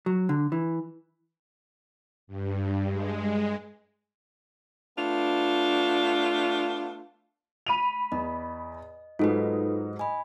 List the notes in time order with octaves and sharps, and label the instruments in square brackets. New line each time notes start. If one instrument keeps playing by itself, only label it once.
[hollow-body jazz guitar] F#3
D3
E3
[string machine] G2
G#3
[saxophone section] A3 B3 D4 F4
[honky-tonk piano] B5 D#7 F7
[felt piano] E2 [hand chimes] D#5
[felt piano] G#2 F#3 G#3 [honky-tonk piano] D#4 [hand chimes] F4 A4 B4
[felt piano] D#5 [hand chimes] G#5 B5